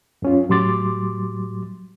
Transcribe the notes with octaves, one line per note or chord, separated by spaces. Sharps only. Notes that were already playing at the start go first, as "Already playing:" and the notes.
F#2 C#4 F4
A2 F#3 G3 C6 D6 A6